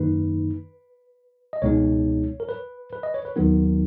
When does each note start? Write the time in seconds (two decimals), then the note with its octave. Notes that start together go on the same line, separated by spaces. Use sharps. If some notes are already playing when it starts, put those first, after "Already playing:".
Already playing: F#2 D#3 A#3 D#4 B4
1.53 D#5
1.62 C#2 B2 G#3 B3 D#4 C#5
2.40 A#4
2.49 B4
2.93 B4
3.03 D#5
3.14 C#5
3.25 B4
3.36 D#2 D#3 F#3 B3 D#4 A#4